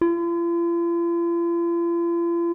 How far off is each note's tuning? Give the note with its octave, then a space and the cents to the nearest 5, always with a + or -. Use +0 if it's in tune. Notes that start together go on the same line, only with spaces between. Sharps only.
F4 -45